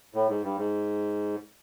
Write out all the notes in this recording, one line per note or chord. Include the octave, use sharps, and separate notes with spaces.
A2
G#2
G2
G#2